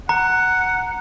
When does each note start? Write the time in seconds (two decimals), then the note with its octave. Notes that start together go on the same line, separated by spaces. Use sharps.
0.09 F#5 A#5